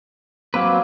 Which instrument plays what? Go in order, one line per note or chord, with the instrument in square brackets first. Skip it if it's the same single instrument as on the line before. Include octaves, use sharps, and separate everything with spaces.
[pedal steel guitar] F#3 C4 B4 [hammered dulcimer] A#3